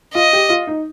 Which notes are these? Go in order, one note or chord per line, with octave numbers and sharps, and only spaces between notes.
F4 D#5
G4
F4
D#4